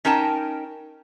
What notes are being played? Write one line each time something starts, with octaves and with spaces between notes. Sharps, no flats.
C#4 D#4 A#4 G5 A5